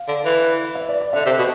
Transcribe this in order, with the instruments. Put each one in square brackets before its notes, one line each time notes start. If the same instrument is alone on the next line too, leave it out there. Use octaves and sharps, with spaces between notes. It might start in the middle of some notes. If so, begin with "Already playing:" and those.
Already playing: [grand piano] F5
[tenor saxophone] D3
E3
[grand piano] E5
D5
D5
[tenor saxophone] D3 [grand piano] E5
[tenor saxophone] C3
B2